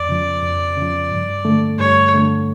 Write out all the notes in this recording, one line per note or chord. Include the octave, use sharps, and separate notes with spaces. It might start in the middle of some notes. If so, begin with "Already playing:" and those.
Already playing: F2 D5
C#3 F3
F2
C#3 F3
G2
D3 A3
G2 C#5
D3 A3